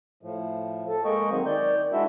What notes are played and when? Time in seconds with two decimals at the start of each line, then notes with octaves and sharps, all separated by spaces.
0.23 A2 F3
0.89 A4
1.05 G#3 A#3 D#5 G5 C#6
1.30 D#3 F#3 C4
1.46 D#3 D5 G6
1.92 G#3 D4 E4 F#4 E5